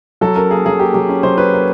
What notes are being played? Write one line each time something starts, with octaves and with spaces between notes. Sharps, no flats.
F#3 A4
C#4 A#4
A#3 G#4
F#3 G#4
A#3 G4
F#3 G4
C#4
F#3 C5
C#4 B4
A#3